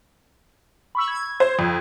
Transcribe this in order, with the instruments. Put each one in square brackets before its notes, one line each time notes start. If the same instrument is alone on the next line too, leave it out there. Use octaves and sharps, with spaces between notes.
[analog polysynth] B5 C#6 E6
G#6
[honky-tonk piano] C5
F2